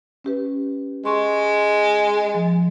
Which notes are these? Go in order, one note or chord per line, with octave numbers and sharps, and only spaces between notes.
C#4 G4 B4
G#3 C6 C#6
F3